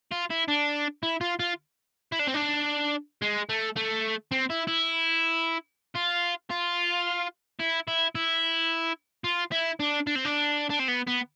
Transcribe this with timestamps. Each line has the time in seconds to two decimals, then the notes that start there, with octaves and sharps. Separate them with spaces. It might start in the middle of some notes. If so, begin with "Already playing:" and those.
0.11 F4
0.30 E4
0.48 D4
1.03 E4
1.21 F4
1.39 F4
2.12 E4
2.19 D4
2.28 C4
2.34 D4
3.22 G#3
3.49 A3
3.77 A3
4.32 C4
4.50 E4
4.67 E4
5.95 F4
6.50 F4
7.60 E4
7.88 E4
8.15 E4
9.24 F4
9.52 E4
9.80 D4
10.07 D4
10.15 C4
10.25 D4
10.70 D4
10.80 C4
10.88 B3
11.08 B3